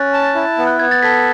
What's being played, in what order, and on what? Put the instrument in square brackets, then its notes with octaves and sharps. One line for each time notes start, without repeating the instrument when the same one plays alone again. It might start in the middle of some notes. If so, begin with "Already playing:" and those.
Already playing: [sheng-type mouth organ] C#4 [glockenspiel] F#6 A6
[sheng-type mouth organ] A5
E4
B3
[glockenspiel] F#6
[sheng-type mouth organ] B3 [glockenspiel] G#6
[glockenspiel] A6
[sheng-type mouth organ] A4 [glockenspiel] G#6 B6